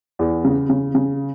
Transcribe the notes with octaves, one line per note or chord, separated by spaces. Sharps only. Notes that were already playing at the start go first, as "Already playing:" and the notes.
E2
C#3
C#3
C#3